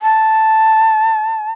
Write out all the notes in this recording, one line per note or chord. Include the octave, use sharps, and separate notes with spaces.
A5